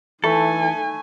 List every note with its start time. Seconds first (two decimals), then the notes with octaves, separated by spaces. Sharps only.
0.24 E3 A3 D#4 A4 G#5 B5